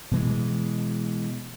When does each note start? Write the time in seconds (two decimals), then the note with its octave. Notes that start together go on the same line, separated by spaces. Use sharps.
0.11 B2 E3 G#3